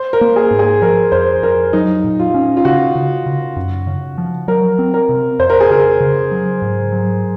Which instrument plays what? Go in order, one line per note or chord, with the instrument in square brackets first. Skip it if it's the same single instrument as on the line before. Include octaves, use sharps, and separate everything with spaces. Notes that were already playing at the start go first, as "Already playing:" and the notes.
Already playing: [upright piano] C5
A#4
[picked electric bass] A#3
[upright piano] G#4
[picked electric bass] G#2
[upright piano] G#4
[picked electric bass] F3 [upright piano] A#4
[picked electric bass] F2 [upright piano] C5
[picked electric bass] F2 [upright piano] A#4
[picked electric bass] F#3 [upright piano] D#4
[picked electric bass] A#2
[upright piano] F4
[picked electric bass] C#4
[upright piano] F4
[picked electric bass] C#3 [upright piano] F#4
[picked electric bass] C#3
C#3
F#2
C#3
F3
[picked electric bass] F#3 [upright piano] A#4
[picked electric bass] C4
[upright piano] A#4
[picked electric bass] C3
[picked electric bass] F2 [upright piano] C5
[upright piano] A#4
G#4
[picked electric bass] C#3 [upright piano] A#4
[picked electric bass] C#3
F#3
G#2
F#3